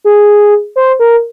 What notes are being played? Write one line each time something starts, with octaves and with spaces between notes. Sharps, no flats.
G#4
C5
A#4